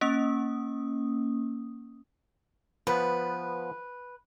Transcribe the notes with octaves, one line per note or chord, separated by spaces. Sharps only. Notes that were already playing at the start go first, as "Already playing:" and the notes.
A#3 C#4 D#6
F3 B3 B4